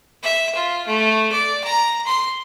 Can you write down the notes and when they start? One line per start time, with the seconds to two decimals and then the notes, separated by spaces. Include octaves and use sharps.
0.23 E5
0.55 F4
0.87 A3
1.32 D5
1.64 A#5
2.07 C6